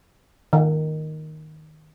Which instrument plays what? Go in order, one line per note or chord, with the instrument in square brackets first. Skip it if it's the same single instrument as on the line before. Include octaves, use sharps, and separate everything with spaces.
[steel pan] D#3